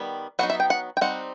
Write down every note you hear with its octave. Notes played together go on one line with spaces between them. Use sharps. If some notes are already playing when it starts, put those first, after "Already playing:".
Already playing: D#3 G3 B3
F#3 B3 D#4 F#5
E5
G5
F#5
G5
G3 C4 D#4 F#5